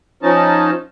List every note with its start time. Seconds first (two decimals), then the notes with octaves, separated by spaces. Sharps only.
0.23 F3 C#4 D#4 A5